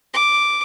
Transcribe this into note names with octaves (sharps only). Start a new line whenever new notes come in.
D6